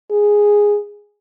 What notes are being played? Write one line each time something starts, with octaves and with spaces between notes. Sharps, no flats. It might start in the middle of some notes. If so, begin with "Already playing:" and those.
G#4